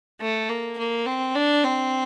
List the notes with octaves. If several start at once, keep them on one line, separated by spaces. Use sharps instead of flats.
A3
A#3
A#3
C4
D4
C4